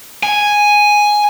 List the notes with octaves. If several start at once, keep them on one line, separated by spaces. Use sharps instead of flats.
G#5